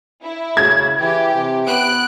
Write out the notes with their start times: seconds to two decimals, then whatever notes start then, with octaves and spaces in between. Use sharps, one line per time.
0.23 E4
0.57 C#3 G#6
1.00 E3 G4
1.35 C3
1.67 B3 F#6 D7